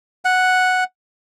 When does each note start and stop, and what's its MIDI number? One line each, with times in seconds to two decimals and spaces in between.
0.25 0.84 78